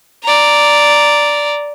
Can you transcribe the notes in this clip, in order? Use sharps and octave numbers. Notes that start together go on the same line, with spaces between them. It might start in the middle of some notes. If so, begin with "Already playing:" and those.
D5 A#5